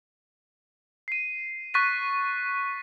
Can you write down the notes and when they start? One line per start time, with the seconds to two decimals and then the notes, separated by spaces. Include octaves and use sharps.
1.08 C7 D#7
1.74 C#6 F#6 A6 B6 D#7